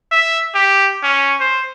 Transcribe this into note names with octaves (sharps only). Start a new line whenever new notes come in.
E5
G4
C#4
C5